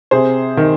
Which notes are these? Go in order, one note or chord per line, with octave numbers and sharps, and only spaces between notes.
C3 G#4 C5
D#3